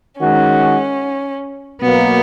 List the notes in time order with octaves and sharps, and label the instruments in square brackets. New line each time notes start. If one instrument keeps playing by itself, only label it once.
[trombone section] D#3 G#3 D#4 F#4 [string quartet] C#4
[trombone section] B2 F#3 A#3 [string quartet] B3